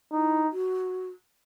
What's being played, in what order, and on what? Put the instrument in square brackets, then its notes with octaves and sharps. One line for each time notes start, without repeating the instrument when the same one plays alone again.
[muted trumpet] D#4 [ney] E4
[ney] F#4